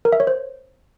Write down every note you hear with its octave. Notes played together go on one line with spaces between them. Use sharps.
A#4
E5
C#5
C5